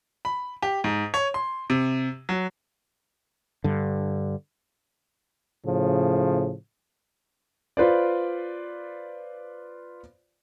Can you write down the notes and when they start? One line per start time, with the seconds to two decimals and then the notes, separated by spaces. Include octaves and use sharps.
0.25 B5
0.63 G4
0.84 G#2
1.14 C#5
1.34 C6
1.70 C3
2.29 F#3
3.64 G2 D3
5.66 A2 C#3 F3
7.77 F4 B4 C5 D5